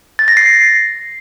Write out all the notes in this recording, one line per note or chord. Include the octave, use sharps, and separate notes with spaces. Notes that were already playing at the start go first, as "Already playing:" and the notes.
A6
A#6
C7